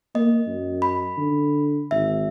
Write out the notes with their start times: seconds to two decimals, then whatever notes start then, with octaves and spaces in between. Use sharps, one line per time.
0.15 A#3 D#5
0.48 F#2
0.82 B5
1.18 D3
1.91 G#1 E5